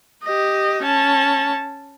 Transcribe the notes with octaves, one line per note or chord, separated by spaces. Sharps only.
G4 D#5
C#4 A5